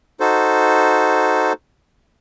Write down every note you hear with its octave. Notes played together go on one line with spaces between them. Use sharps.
D#4 F#4 A4 C5